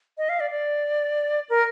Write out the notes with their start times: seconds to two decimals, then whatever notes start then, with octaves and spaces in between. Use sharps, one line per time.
0.18 D#5
0.29 F5
0.40 D5
0.51 D5
1.50 A#4